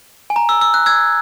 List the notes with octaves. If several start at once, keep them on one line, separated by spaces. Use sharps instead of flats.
G#5
A#5
E6
E6
F#6
E6 G#6